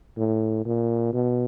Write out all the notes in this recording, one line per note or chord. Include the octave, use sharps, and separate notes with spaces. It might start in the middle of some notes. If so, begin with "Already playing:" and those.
A2
A#2
B2